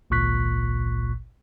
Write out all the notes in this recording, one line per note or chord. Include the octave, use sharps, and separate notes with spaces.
G#1 C#2 A#2 C#6 F#6 B6